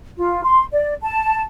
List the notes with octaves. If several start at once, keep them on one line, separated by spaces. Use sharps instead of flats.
F4
C6
D5
A5